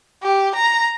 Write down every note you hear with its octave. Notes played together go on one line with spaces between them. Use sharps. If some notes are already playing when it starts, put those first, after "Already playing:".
G4
A#5